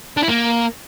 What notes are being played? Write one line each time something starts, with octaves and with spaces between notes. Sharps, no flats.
D4
E4
A#3